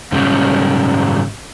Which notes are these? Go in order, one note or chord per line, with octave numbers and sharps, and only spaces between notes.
G#2 C#3 G3 A3 C#4